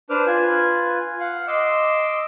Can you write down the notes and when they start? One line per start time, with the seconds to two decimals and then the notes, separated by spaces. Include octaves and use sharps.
0.10 D4 B4 C5 D6 F6
0.26 F4 B4 G#5
1.20 F5 F#5
1.48 D#5 C6 D6 E6